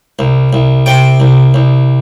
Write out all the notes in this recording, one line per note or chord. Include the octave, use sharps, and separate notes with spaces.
C2
C2
C3 G5
C2
C2